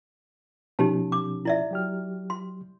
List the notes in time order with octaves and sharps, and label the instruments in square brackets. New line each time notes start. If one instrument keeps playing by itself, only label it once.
[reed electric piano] B2 F3 C#4 [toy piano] D#4 G4 A5
[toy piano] D6
E4 D5 E5
[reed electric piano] F#3 G4 F6
[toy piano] C6